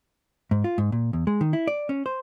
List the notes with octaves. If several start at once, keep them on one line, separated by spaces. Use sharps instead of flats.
G#2
F4
G#2
A#2
E2
G#3
D#3
E4
D5
C#4
C5